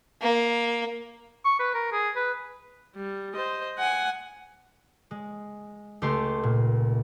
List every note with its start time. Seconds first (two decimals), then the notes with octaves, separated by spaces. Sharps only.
0.22 A#3
1.45 C#6
1.59 B4
1.74 A#4
1.92 G#4
2.16 B4
2.96 G3
3.34 C5 D#5
3.78 F#5 G#5
5.11 G#3
6.02 C#2 A3 G4 C6
6.43 A#2